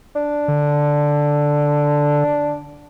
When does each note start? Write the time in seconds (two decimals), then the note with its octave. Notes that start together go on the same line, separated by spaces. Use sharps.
0.15 D4
0.48 D3